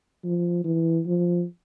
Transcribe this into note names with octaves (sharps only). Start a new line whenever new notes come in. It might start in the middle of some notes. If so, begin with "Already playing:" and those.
F3
E3
F3